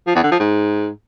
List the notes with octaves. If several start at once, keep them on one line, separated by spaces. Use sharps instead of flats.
F3
E2
D3
F3
G#2